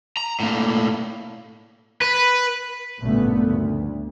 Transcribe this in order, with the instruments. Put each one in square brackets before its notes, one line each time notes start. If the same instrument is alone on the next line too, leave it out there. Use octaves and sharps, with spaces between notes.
[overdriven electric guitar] A#5
A2 A#3
B4
[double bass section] A1 G2 A#2 C#3 A3 B3
D2